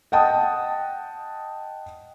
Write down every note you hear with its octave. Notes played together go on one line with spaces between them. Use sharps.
D#5 F#5 G5 A5 D#6